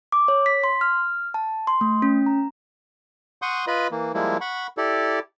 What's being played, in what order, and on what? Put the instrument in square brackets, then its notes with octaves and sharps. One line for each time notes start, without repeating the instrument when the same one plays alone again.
[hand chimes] D6
C#5
B6
C6
F6
A5
C6
A3
C#4
A#5
[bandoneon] F#5 C6 C#6 D#6 G6
F4 B4 D#5 B5
E3 A#3
F3 G3 G#3 A#3 E4
F#5 B5 C#6
E4 G4 A4 D5